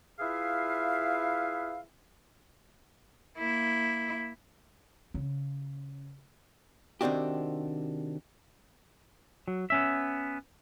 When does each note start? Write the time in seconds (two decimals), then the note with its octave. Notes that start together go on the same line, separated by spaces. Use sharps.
0.20 E4 F4 G#4 B4 E5 F5
3.39 A#3 E4
5.14 C#3
7.01 C3 D#3 C4 D4 F#4 G4
9.48 F#3
9.70 B3 C#4 E5